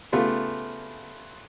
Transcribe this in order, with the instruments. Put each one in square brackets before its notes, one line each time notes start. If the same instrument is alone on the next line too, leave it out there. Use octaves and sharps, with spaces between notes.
[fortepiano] C#3 A3 B3 F4 G4